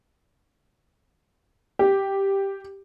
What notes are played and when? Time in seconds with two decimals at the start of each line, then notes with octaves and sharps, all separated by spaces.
1.79 G4